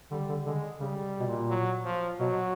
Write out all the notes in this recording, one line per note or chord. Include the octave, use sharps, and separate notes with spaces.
D3 G3
D3
D3 G#3
C#3 G3
B2
A#2
F#3
F3
B2 F#3